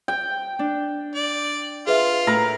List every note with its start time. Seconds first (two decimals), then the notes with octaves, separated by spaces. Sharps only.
0.08 G5
0.59 D4
1.15 D5
1.87 F4 G#4 B4 E5
2.27 A2 A#4 A#5 B5